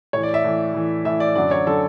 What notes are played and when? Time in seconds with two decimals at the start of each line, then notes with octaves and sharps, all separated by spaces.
0.13 A2 E3 C#5
0.23 D5
0.34 E5
0.44 A2 E3
0.75 A2 E3
1.05 A2 E3 E5
1.20 D5
1.35 F#2 D3 F#3 D5
1.51 C#5
1.67 D3 F#3 A4